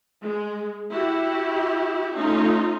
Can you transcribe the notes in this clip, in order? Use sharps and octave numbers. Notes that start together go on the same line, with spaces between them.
G#3
E4 F#4 G4
A3 C#4 D#4 F4